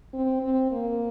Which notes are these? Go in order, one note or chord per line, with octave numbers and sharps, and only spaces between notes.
C4
C4
A#3